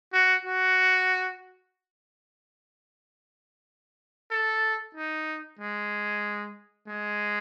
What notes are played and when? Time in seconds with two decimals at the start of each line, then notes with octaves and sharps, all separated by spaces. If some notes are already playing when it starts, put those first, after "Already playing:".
0.13 F#4
0.45 F#4
4.31 A4
4.95 D#4
5.59 G#3
6.87 G#3